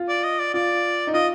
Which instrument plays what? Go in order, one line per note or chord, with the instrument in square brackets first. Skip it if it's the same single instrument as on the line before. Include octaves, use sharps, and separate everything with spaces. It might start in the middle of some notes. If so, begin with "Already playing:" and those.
Already playing: [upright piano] F4
[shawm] D5
D#5
D5
[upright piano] F4 [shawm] D5
[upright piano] D#4
[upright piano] F4 [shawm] D#5